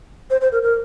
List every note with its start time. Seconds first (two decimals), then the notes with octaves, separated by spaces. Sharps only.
0.30 C5
0.41 C5
0.52 A#4
0.62 A#4